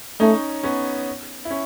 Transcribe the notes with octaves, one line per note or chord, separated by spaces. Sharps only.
A3 C#4 D#4
B3 C#4
E4
C#4